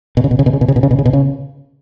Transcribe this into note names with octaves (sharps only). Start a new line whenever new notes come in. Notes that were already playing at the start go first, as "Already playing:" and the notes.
B2
C#3
B2
C#3
B2
C#3
B2
C#3
B2
C#3
B2
C#3
B2
C#3